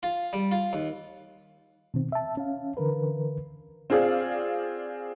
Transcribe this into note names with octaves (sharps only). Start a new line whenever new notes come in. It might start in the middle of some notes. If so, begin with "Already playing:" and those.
F4
G3
F4
D#2
B2 D#3 C4
E5 A5
C#4 F5
D3 E3 A#4 B4
C4 F4 G#4 D5 F5